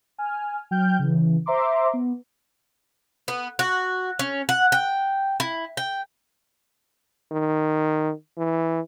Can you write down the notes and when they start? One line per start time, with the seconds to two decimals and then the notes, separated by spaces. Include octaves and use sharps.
0.18 G#5 F6
0.71 F#3 G5 F6 G6
0.99 C#3 E3
1.46 C5 E5 A#5 C6 D6
1.93 B3
3.28 B3
3.59 F#4
4.19 C#4
4.49 F#5
4.72 G5
5.40 E4
5.77 G5
7.32 D#3
8.37 E3